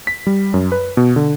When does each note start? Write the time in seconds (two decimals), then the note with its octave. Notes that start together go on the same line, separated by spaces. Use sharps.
0.07 B6
0.27 G3
0.54 F#2
0.72 B4
0.97 B2
1.16 D3